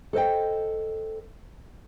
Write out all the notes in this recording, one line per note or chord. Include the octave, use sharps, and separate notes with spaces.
A4 C5 D#5 G5